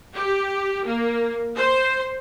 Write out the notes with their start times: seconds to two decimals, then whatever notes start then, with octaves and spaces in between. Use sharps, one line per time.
0.15 G4
0.86 A#3
1.57 C5